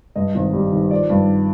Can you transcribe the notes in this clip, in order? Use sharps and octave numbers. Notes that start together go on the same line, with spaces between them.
G2 D#5
G#1
G3
D#3
F3 D5
G2